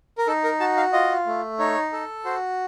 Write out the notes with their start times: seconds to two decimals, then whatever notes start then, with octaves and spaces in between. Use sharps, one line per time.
0.18 A#4
0.27 D#4 A4
0.44 A#4
0.60 F#4 A5
0.77 F5
0.93 F4 D#5
1.26 A3
1.59 D#4 C#5
1.92 A4
2.25 F#4 C5